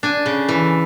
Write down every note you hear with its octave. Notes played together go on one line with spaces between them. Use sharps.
D4 G#5
C#3
E3